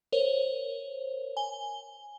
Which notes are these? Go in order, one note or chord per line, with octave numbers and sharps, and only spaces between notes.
A#4 C5 C#5
G#5 G7